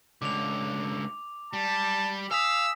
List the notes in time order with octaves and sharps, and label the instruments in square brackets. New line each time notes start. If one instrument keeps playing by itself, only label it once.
[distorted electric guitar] C#2 D3 [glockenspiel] D6 F7
[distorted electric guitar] G3 [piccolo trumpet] A5
[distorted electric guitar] F5 [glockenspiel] G#5 D#6 B6 [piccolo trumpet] E6